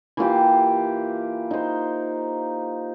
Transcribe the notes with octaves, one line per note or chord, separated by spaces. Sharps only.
E3 A#3 F4 G4
D#4 C5